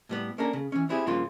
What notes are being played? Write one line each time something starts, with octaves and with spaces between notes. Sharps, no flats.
A2 G3 B3
A#3 C#4 D4 A4 A#4
C#3
E3 C#4
B3 C4 E4 G4 G#4
G2 C#3 F3 A#3 F4 C6